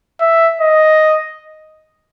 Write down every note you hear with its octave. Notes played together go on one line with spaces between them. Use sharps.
E5
D#5